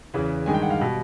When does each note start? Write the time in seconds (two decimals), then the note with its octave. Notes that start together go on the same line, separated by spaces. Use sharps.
0.14 E2 C#3 E3
0.46 G2 D#3 G#3 G#5
0.54 G5
0.62 F#5
0.70 F5
0.80 B2 G3